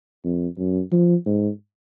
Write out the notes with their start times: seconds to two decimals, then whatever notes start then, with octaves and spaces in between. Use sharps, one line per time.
0.24 F2
0.58 F#2
0.92 F3
1.26 G#2